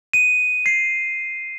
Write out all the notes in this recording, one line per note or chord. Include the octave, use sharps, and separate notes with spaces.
D#7
C7